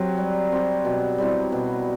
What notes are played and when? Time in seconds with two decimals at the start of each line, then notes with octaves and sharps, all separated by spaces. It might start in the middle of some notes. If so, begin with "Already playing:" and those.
Already playing: F#3 C4 G4
0.18 G3
0.52 C4 G4
0.85 B2
1.18 G3 C4 E4
1.52 B2